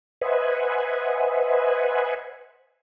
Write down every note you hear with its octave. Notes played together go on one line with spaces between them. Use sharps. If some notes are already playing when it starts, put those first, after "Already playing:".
B4 C5 D#5 E5 F#5 G#5